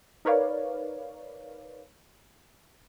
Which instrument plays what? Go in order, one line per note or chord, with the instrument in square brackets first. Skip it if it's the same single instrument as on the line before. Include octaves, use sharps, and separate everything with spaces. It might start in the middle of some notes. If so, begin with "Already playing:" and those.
[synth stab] D#4 A#4 B4 C#5 D5 F5